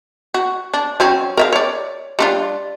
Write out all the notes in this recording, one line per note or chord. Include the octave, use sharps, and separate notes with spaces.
F#4
D4
F#3 C4 C#4
A#4 E5 F5
C#5 D5
G3 D4 F4